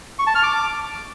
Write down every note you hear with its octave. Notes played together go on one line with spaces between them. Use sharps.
C#6
A5
F6
D6